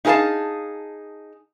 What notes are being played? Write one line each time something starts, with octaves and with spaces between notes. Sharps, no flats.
D#4 E4 G#4 A#4 F5 A5